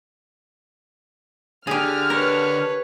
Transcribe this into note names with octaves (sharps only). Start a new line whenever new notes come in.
D3 G4 G#4 F6
A#4 B4 C#5